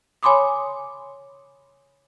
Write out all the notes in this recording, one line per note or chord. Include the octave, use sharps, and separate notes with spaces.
C#5 G#5 B5 C6 D6 D#6